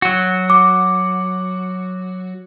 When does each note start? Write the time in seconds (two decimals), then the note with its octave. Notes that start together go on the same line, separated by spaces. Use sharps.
0.02 F#3 F#4
0.50 D6